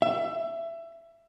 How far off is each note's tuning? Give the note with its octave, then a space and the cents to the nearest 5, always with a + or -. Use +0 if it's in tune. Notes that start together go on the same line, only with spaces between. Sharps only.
E5 +20